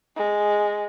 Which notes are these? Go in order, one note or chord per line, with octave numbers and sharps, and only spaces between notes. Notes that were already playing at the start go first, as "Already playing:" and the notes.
G#3